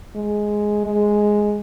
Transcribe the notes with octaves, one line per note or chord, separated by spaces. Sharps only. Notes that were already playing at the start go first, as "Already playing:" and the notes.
G#3
G#3